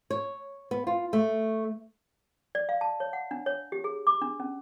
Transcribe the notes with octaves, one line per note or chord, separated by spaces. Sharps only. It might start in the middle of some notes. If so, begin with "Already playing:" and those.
C#5
B3
F4
A3
D5
F5
A5
C#5
F#5
D4
C#5
G4
G#4
D6
D4
C#4